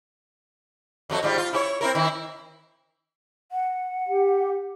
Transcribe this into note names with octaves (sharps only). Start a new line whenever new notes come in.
F2 F#3 A3
G#2 G3 F4
F4
E4 G4 C#5
C4 E4 A#4
D#3 E4
F#5
G4